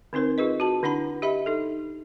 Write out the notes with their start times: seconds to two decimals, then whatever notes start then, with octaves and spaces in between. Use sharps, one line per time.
0.13 D3 C4 D#4 A#4 C5
0.38 F4 G#4 B4 D#5
0.60 F#4 A5
0.83 D3 D4 E4 F#5 A#5 B5
1.22 G4 D#5 E5 B5
1.46 D#4 A4